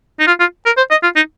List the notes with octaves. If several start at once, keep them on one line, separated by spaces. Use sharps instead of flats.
D#4
F4
F4
A#4
C5
D#5
F4
D#4